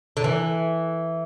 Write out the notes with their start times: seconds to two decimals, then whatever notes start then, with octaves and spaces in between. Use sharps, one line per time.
0.17 D3
0.24 E3